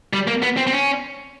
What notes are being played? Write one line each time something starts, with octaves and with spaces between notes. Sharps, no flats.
G3
A#3
B3
C4
C4
C#4